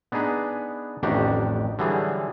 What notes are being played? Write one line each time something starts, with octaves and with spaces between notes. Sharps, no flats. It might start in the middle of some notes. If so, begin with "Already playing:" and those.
B3 D4 D#4 G#4 B4
A1 F2 D#3 D4 F#4 G4
D3 E3 F#3 G3 G#4